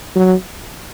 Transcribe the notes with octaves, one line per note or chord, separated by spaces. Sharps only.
F#3